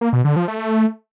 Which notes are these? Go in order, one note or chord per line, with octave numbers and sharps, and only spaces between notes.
A#3
B2
D3
F3
A3